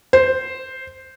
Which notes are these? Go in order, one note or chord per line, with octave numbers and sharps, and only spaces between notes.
C5